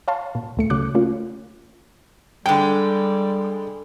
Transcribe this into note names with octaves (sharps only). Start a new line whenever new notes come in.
C#5 F5 A5 C6
A#2
D2 A3 C#7
C#3 F#3 D6 F#6
A3 A#3 C#4 F4
D3 G3 G#3 G5